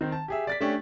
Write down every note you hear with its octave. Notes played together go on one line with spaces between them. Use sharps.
D#3 C4
A5
G4 G#4 E5
D5 A6 B6
A3 C#4 D4 G4